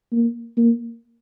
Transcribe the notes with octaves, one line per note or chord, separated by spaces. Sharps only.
A#3
A#3